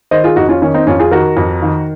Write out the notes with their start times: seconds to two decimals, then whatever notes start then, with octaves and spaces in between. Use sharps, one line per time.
0.11 D#3 C5 D#5
0.24 F4 G#4
0.36 F2 D#4 F#4
0.49 C#4 F4
0.62 D#3 C#4
0.74 C4 D#4
0.87 F2 C#4 F4
0.99 F4 G#4
1.11 D#3 F#4 A#4
1.37 F2
1.62 D#3